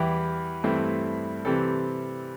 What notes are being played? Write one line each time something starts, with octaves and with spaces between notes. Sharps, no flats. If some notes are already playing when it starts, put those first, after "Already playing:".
Already playing: E2 E3 G3 E4 G4
G2 E3 A3 C4 E4
C3 E3 G3 C4 A4